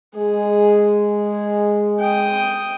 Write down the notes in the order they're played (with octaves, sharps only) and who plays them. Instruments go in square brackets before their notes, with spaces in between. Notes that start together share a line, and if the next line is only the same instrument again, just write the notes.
[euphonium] G#3 [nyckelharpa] G#4
[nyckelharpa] G#4
G5 D#6